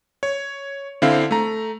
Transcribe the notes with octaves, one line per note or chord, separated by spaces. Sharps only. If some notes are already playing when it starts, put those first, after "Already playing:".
C#5
D3 C4 E4 F5
A3 A#5